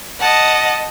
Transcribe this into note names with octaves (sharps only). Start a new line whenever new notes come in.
D#5 F#5 A5